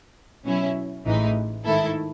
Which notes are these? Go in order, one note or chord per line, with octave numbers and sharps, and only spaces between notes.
B2 F#3 C#4 E4
A1 A2 E3 G#3 D#4
G#2 D#3 A3 E4 A4